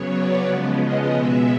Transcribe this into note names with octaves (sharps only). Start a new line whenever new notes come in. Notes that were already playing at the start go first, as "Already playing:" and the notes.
Already playing: C#3 F#3 B3 C#5
D5
C#3 F3 G#3 B3
D#5
B2 G#3 B3 E5